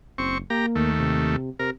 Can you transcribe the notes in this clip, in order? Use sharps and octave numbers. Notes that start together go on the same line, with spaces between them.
F#1 C4 C#6
A#3 G4 A#5
D#2 A3
C3
C3 A#4